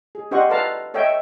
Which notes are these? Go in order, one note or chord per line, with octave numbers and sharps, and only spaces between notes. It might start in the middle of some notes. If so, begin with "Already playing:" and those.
G#4
D4 G4 C5 D#5 F#5 C#6
A4 B4 C5 F5 A5 A#5
A4 C#5 D#5 E5 G5